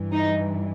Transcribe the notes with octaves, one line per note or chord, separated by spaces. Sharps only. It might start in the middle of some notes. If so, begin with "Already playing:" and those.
Already playing: G2 E3
D#4